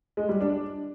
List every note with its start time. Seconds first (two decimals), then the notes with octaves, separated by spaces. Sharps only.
0.17 G#3
0.29 G3
0.40 D4